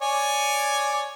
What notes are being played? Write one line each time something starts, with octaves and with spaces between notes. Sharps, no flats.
C#5 D5 G#5